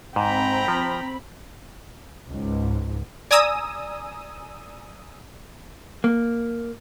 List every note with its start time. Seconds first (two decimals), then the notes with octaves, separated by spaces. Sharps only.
0.16 G#2 C4 G5 A#5 B5
0.68 F3
2.29 C#2 G#2
3.31 D5 G#5 A#5 D#6 E6
6.04 A#3